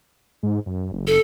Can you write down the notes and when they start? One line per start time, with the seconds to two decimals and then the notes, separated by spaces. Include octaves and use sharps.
0.43 G#2
0.66 F#2
0.92 F#1
1.07 A4